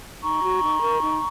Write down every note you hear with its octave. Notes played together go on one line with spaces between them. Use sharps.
D#4 A#5 C#6
F#4
D#4
A#4
D#4